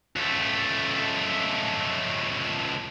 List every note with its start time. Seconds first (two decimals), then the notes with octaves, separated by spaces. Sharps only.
0.16 C#2 A3